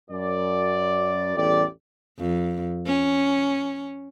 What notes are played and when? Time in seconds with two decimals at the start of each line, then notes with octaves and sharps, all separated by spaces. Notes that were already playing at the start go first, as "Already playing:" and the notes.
0.10 F#2 D5
1.37 A1 E2 G3 A3 G4 D5
2.19 F2
2.87 C#4